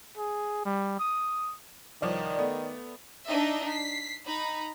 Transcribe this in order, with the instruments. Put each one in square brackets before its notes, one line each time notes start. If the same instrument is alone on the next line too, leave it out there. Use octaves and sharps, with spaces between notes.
[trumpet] G#4
G3
D#6
[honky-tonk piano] C2 F3 C#5 [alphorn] D#3 [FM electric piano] D5
[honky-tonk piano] A3 B3
[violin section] D4 D#4 D#5 E5
B6 C7
D#4 A#5 B5